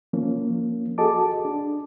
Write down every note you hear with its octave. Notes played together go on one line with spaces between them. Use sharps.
F3 A#3 C#4
F#4 G#4 A4 D#5 A5 D6
D4